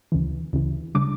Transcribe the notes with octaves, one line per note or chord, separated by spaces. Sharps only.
D2 C#3 E3
D2 C#3 E3
C#3 G3 D4 D6